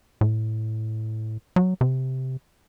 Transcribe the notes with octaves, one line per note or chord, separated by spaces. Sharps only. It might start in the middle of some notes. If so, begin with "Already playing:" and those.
A2
F#3
C3